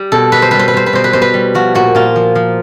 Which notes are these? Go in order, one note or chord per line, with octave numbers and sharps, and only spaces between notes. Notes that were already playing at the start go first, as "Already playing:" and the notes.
Already playing: G3
B2 A4
B2 B4
C5
G3 B4
C5
B4
G3 C5
B4
B2 C5
B4
B2 C5
B4
G3
F3 F#4
A#2 F#4
A#2 F4
F3
F3